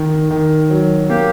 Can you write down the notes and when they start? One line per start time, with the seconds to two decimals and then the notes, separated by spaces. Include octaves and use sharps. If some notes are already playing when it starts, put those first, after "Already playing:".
Already playing: D#3
0.31 D#3
0.70 F#3
1.09 A#3 G4